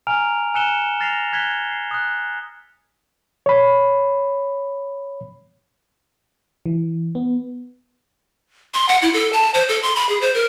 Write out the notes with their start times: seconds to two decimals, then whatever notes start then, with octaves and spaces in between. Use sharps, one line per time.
0.07 G#5 A#5 F6 D7 F7
0.54 G#5 E6 F#6 C#7 E7 G7
1.00 F6 A6 A#6 C7 F7
1.33 F#6 G#6 B6 C#7 G7
1.71 C7
1.91 D#6 F#6
3.46 C#5 B5
6.66 E3
7.15 B3
8.74 C6
8.89 F#5
9.02 E4
9.14 A4
9.33 A5
9.54 C5
9.69 A4
9.83 C6
9.96 B5
10.09 G#4
10.21 C5
10.34 A#4